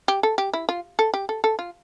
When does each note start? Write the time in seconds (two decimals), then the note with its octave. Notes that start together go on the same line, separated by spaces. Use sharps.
0.08 G4
0.23 A4
0.38 G4
0.53 E4
0.69 F4
0.99 A4
1.14 G4
1.29 A4
1.44 A4
1.59 F4